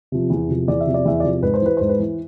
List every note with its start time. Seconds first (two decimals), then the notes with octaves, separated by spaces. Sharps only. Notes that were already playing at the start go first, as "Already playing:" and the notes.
0.12 C3 F3
0.30 E2
0.49 C3 F3
0.68 E2 D5
0.81 E5
0.87 C3 F3
0.94 D5
1.05 E2 E5
1.20 D5
1.24 C3 F3
1.42 G#2 B4
1.54 C5
1.62 E3 B4
1.77 G#2 C5
1.89 B4
1.99 E3